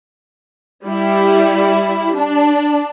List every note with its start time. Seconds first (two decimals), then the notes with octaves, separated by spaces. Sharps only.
0.85 G3 E4
2.15 D4